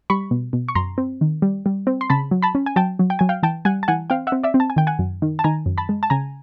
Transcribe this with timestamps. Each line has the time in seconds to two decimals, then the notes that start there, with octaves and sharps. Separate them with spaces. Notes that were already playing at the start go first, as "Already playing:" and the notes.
0.10 G3 B5 C#6
0.31 B2
0.53 B2
0.69 C#6
0.75 F#2 A#5 C6
0.98 C4
1.21 D#3
1.42 G3
1.66 G3
1.87 C4
2.01 C6
2.10 C#3 A5 B5
2.31 F#3
2.43 A5 B5
2.55 C#4
2.66 G#5
2.76 F#3 G5 A5
2.99 F#3
3.10 G5
3.19 F#3 G#5
3.29 F5 G5
3.43 E3 G5 A5
3.65 G3 F#5 G#5
3.83 A5
3.88 E3 F#5 G#5
4.10 C4 F5 G5
4.27 E5 F#5
4.32 C4
4.43 D5 E5
4.54 C4
4.60 A5
4.70 G#5
4.76 D#3 G5
4.87 F#5 G#5
4.99 F#2
5.22 D#3
5.39 A5
5.44 D#3 G#5 A#5
5.66 F#2
5.78 A5 B5
5.89 G#3
6.03 A5
6.10 C#3 G#5 A#5